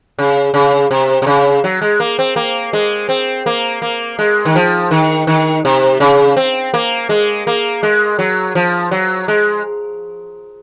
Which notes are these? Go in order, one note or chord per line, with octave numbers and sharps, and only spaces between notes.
C#3
C#3
C3
C3
C#3
F#3
G#3
A#3
C4
A#3
G#3
C4
A#3
A#3
G#3
D#3
F3
D#3
D#3
C3
C#3
C4
A#3
G#3
A#3
G#3
F#3
F3
F#3
G#3